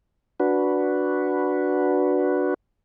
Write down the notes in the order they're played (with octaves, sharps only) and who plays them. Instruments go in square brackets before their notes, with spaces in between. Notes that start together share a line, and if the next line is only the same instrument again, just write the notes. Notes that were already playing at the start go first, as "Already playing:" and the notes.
[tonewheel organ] D4 F#4 B4